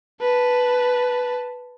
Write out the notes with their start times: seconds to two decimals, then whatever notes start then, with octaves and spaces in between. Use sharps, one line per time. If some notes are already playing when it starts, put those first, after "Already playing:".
0.21 B4 A5